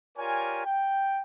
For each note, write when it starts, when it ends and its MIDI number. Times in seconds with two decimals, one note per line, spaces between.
0.18 0.63 65
0.18 0.63 67
0.18 0.63 70
0.18 0.63 73
0.18 0.63 74
0.18 0.63 80
0.66 1.22 79